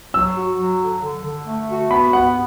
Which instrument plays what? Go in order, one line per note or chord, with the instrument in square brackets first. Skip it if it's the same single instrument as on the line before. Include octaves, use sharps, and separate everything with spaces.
[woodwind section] F#3 [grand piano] E6
[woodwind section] F#4
F#3
D3
D3
D3
A3
F#4
[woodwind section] B3 [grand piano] B5
[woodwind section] B3 [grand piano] F#5